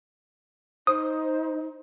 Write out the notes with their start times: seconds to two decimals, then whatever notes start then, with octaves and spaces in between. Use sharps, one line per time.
0.87 D#4 C5 D#6